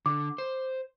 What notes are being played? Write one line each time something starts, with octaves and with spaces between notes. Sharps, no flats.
D3 D6
C5